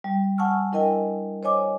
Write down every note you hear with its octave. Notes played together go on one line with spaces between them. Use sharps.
G3
F#5 G#5 A5 C#6 E6 F6
D4 E4 A#4 D#5 G5 G#5
C5 C#5 D#5 G#5 D6